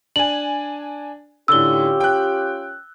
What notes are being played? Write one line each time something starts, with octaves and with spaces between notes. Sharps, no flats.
D4 G#5 F#7
A2 D3 C#4 F4 G4 E6 G7
G5 F#6